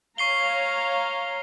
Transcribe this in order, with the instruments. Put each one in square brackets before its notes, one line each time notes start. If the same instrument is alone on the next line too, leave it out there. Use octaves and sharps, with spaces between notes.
[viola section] C#5 F5 A#5 [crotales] C#6 C7 G7